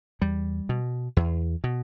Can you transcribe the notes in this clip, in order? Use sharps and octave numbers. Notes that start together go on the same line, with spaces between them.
E2 G3
B2
E2
B2